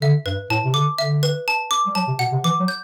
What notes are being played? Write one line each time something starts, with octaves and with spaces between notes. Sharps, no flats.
D3 E5
G2 B4
A2 A5
C3
D3 D6
D3 E5
B4
A5
D6
G3
F#3 A5
C3
B2 F#5
C3
E3 D6
F#3
G6